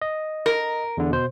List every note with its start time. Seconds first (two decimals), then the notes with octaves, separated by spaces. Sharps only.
0.02 D#5
0.46 A#4
0.97 E2 D3
1.11 B2 C5